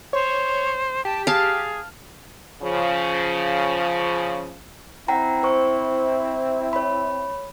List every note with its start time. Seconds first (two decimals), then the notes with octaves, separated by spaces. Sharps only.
0.13 C5 C#5
1.05 G4 A5
1.27 G#4 F5 A5
2.63 C#3 F3
5.08 C4 E4 F#5 G5 A#5
5.43 C5 C#6
6.73 C#5 B5